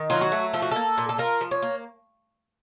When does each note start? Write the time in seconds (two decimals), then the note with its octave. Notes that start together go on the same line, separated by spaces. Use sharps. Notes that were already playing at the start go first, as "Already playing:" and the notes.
Already playing: D#3
0.10 F#3 F4
0.21 F#4
0.32 A3
0.53 F3 A4
0.62 F#4
0.71 A#3 A4
0.98 A#2
1.09 A4
1.18 F4 A#4
1.41 F3
1.51 C#5
1.62 A#3